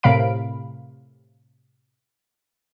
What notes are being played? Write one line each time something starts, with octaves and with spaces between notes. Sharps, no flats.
A2 C3 A#4 F5 B5 D7